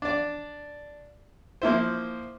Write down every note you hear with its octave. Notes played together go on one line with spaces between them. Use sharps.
D4 D5
F3 A#3 E4 C5